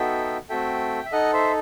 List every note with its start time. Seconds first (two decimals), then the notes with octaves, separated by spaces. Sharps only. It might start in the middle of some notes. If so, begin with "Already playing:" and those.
Already playing: B3 D#4 F#4 A4 E5 G5
0.49 A3 C4 F#4 A4 E5 G5
1.05 E5
1.12 D#4 A4 D#5 F#5
1.33 C5 E5